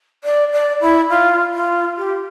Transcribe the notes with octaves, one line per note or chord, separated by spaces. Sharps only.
D5
D5
E4
F4
F4
G4